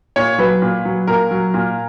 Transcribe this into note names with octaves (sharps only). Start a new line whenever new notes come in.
A#2 C#5
F#3 B4
A#2
F#3
A#2 A#4
F#3
A#2